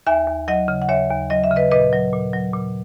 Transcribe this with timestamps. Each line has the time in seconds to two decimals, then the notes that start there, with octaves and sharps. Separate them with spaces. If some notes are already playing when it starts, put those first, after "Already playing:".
0.07 D#2 E5 G#5
0.27 D#2
0.48 F#3 D#5 F#5
0.68 C#3
0.82 F#5
0.89 D#2 C#5 E5
1.10 D#2
1.30 F#3 D#5
1.44 E5
1.51 C#3
1.56 B4 D#5
1.71 A#2 B4 D#5
1.93 F#3
2.13 A#2
2.33 F#3
2.54 A#2